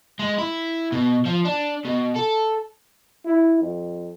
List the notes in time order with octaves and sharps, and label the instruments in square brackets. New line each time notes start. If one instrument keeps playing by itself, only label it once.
[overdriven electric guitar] G#3
E4
B2
F3
D4
B2
A4
[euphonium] E4
F2